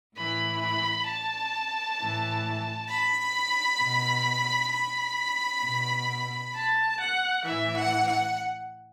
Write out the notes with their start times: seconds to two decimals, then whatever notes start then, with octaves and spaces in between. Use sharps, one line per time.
0.15 A2 E3 B5
0.61 B5
1.06 A5
1.98 A2 E3
2.89 B5
3.80 B2
4.72 B5
5.63 B2
6.55 A5
7.00 F#5
7.45 A2 E3 E5
7.77 F#5
8.06 F#5